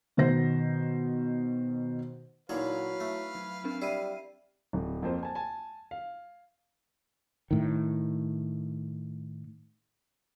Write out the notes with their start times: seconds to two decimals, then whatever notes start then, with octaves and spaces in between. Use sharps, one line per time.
0.17 B2 D#3 B3 C5 A#6
2.49 A#2 D3 F#3 D#4 E4 B4 C#5 F5
3.00 A3
3.35 F#3
3.64 C4 D4 A#4
3.82 G3 E4 C7 D#7
4.73 D1
5.02 F2 A#3 C5
5.23 G#5 A5
5.35 G#5 A5
5.91 F5
7.51 A2 D#3